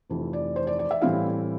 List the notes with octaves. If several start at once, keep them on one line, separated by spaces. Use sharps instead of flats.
F1 F2 E3
D5
C5
D5
D5
E5
A2 E3 G3 C4 E4 F5